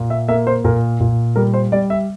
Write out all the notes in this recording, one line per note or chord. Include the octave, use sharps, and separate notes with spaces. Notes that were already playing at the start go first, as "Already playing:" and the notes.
Already playing: A#2
E5
A#3 E5
C5
A#2 A#4
A#2
G3 A#4
C5
G3 D5
E5